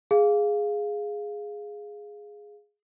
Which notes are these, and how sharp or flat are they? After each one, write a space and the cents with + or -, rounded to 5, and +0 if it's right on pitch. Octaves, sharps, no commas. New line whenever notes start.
G#4 +0 F5 +0